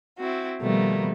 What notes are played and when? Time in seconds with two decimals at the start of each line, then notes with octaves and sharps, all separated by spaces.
0.19 C4 E4 F#4
0.61 B2 D#3 F3 G3 A3 A#3